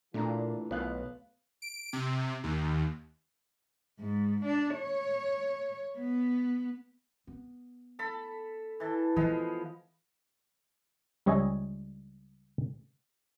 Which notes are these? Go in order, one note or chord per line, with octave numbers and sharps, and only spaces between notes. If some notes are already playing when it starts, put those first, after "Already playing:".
A#2 E3 A3 D4 F4 A#5
B1 B3 F5 F#6
D7
C3
D#2
G#2
D4
C#5
B3
B3
A4 B5
E3 A4
E3 F3 G#3 B3
C#2 G3 C#5 D#5 E5 G#5